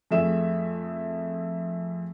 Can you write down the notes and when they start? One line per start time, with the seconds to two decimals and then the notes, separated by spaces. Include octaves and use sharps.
0.11 F2 A3 G#4 E5 E7